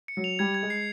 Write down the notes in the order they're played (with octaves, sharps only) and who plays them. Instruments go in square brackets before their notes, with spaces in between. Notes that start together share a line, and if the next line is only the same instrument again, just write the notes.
[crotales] C#7
[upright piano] F#3
[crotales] F7
[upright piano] G3 [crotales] G#6
[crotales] G#6
[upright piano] G#3
[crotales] C7